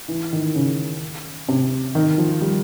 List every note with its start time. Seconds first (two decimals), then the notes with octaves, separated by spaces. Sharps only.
0.08 E3
0.33 D#3
0.55 C#3
1.48 C3
1.95 D#3
2.18 F3
2.41 G3